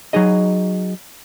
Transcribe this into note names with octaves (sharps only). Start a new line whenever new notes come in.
F#3 D#4 G#4 D#5